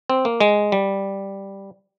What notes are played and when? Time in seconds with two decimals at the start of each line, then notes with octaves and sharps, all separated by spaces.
0.10 C4
0.25 A#3
0.40 G#3
0.72 G3